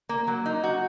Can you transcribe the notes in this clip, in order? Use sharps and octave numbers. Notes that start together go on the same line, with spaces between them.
A#3
F#3
D#4
F#4